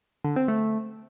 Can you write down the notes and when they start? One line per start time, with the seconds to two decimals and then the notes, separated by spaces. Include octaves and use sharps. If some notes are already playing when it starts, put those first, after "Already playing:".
0.24 D3
0.36 C4
0.48 A3